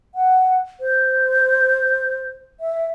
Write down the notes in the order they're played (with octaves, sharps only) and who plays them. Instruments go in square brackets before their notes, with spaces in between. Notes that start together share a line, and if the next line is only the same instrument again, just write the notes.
[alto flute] F#5
C5
E5